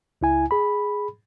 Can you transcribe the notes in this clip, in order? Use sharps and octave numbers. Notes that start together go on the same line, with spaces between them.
C#2 E4 G#5
G#4 B5